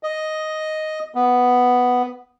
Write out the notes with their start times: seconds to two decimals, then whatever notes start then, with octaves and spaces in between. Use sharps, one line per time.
0.03 D#5
1.15 B3